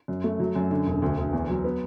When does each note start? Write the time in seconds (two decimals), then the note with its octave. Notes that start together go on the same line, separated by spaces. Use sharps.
0.08 F#2
0.24 A3
0.40 F#3
0.56 F#2
0.71 D3
0.86 E1
1.02 D2
1.18 D2
1.33 E2
1.49 F#3
1.64 B3